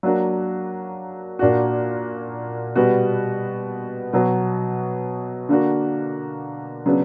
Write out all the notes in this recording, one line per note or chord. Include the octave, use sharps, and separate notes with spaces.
F#3 A#3 D4 F#4
A#2 A#3 D4 F#4
B2 G3 B3 F#4
B2 F#3 B3 F#4
D3 A#3 D4 F#4
C#3 F#3 B3 D4